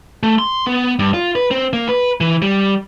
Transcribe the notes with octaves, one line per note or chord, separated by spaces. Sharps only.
A3
C6
B3
G2
F4
B4
C4
A#3
B4
E3
G3